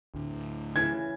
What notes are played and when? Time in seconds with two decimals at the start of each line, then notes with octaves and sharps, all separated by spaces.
0.14 D2 A2
0.76 C#3 E3 G#6